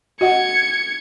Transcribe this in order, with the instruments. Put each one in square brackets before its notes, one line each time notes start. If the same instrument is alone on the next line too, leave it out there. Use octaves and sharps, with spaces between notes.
[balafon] F#4 D#5 F#5 [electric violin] G#6 C#7